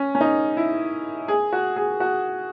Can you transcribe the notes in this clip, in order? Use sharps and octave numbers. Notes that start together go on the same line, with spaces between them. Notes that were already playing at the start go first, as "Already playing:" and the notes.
Already playing: C#4
C#4
D#4
E4
G#4
F#4
G#4
F#4